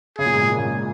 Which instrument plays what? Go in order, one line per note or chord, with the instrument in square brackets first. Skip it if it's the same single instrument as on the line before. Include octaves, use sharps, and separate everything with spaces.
[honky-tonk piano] C#3 [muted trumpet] G#4
[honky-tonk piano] A#2
G#2
A#2
D#3
C#3
A#2